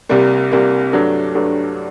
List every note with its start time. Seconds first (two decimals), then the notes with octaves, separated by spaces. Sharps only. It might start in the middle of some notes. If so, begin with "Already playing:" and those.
0.09 C2 C3 G3 A#3
0.51 C2 C3 G3 A#3
0.93 G2 F#3 A3 D4
1.35 G2 F#3 A3 D4